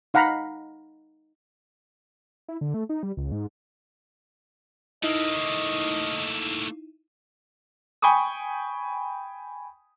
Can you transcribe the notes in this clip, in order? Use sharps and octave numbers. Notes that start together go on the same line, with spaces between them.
D#4 F5 F#5 A#5 B5
E4
D3
A3
D#4
G3
C#2
G#2
A3 A#3 D#4 E4 D#5
G5 G#5 B5 C#6 D#6